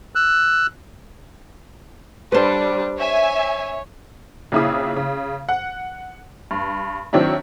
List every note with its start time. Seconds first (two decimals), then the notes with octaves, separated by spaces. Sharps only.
0.15 E6 F#6
2.32 G3 D4 B4 C5 A5
2.98 C#5 E5 G#5
4.52 A#1 C#3 E4 G#4 D#6
4.96 C#3
5.49 F#5
6.51 G2
7.13 D#3 F#3 C4 D4 E4